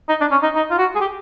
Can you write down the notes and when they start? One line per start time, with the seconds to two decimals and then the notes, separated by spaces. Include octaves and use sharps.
0.09 D#4
0.21 D4
0.31 C#4
0.43 D#4
0.55 D#4
0.70 F4
0.78 F#4
0.95 G#4
1.01 G4